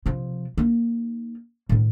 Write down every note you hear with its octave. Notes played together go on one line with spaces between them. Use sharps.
C3 F3
A#3 D#4
A2 D#3